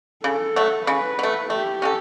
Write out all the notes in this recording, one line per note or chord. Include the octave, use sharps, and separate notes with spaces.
C#3 A4
F#3 A3
C#3 B4
F#3 A3
A3 G4
C#4 F#4 A4